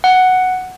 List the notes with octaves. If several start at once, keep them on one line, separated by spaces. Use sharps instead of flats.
F#5